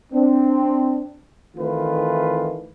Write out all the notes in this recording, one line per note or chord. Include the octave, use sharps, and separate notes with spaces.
C4 D4
D#3 E3 A3 C4 F4 B4